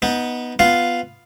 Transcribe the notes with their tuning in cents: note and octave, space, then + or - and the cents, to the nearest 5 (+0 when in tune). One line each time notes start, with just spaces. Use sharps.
B3 -10 D#4 +15
B3 +0 F4 +0 F5 +0